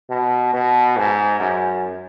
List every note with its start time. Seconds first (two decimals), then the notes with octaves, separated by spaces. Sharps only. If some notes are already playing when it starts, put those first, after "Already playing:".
0.10 B2
0.54 B2
0.97 G#2
1.40 F#2